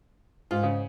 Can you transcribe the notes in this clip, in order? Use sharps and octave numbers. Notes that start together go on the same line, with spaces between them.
G#2 F4
C#3